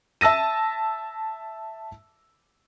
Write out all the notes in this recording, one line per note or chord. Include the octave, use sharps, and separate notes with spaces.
E5 A5 E6 A#6 D#7